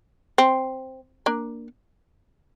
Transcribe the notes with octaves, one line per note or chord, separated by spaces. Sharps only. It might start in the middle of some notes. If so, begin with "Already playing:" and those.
C4
A#3 D4